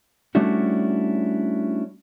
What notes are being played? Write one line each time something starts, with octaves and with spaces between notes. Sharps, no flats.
G3 A3 C#4 D4 E4 F#4